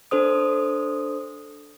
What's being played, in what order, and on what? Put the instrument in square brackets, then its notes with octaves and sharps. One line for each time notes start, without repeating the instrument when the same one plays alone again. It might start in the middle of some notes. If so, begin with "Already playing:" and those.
[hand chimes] D4 A4 C5 D#6